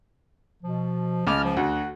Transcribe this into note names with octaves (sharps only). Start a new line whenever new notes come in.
B2 F3
C#2 D#5 A5 D6 F6
F3
D2 F#4 F#5